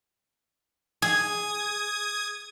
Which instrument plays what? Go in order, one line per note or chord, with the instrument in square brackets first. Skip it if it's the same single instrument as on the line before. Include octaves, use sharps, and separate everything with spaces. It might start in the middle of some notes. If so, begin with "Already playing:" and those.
[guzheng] G#4 [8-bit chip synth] D#6 G#6